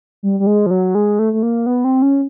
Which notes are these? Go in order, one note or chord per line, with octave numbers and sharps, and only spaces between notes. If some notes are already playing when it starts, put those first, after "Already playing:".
G3
G3
G#3
F3
F#3
G#3
A3
A3
A#3
B3
C4
C#4